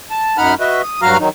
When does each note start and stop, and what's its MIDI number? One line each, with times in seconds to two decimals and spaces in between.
0.10 0.37 81
0.38 0.54 42
0.38 0.54 63
0.38 0.54 78
0.38 0.54 83
0.38 0.54 89
0.60 0.82 66
0.60 0.82 71
0.60 0.82 75
0.60 0.82 76
0.83 1.01 87
1.02 1.17 43
1.02 1.17 54
1.02 1.17 66
1.02 1.17 77
1.02 1.17 82
1.02 1.17 89
1.20 1.29 51
1.20 1.29 54
1.20 1.29 63